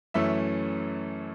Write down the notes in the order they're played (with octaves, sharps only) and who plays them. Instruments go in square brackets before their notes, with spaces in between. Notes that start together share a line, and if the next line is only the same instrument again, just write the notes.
[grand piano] F#2 E3 A3 C#4 E5